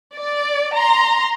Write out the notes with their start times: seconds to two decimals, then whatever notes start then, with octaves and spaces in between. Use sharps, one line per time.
0.17 D5
0.76 A#5 C6